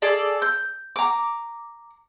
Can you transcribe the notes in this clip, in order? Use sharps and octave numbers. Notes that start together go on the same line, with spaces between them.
G#4 A4 D5
G6
A#5 D6